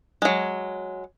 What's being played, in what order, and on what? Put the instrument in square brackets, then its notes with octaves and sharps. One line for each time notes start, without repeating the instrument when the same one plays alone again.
[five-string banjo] F#3 G#3